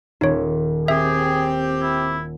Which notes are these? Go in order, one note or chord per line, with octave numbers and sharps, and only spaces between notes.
D#1 D#4 C#5
C4 G4 G#4 E5
E4